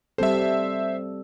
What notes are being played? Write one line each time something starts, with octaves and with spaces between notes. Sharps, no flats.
G3 C4 A4 C5 E5